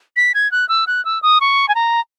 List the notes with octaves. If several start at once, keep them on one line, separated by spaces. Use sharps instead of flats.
B6
G#6
F#6
E6
F#6
E6
D#6
C#6
G#5
A#5